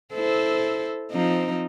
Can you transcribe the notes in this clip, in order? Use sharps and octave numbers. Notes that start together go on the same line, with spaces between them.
E4 A4 C5
F3 C4 D#4